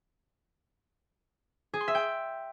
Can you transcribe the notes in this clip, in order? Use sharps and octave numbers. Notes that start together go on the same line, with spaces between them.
G#4
C6
E5
G5